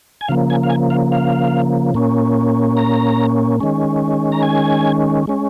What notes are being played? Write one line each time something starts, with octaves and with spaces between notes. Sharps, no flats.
G#5
C#3 F3 A#3 F5
G#5
F5
G#5
F5
F5
A#2 A#3 C#4
A#5
D#3 G#3 C#4
A#5
G#5
G#3 C#4